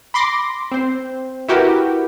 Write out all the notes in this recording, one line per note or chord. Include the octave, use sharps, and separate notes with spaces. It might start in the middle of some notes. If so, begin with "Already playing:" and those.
B5 C6 D6 A#6
C4 C5
E4 F#4 G4 A#4 B4